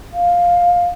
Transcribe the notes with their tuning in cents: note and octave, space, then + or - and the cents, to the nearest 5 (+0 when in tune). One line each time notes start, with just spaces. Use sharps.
F5 +10